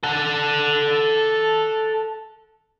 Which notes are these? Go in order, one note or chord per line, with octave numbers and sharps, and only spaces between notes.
A4 F#5